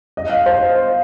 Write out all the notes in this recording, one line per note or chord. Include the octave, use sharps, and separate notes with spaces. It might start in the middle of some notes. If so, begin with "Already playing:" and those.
D#5
F5
C5